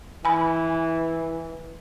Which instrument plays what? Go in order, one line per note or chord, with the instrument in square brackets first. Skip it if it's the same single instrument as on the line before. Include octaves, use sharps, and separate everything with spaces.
[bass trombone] E3 [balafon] G#5 B5